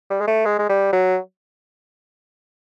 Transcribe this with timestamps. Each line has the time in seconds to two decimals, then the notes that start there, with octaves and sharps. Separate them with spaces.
0.10 G3
0.20 G#3
0.27 A3
0.45 G#3
0.59 G#3
0.69 G3
0.92 F#3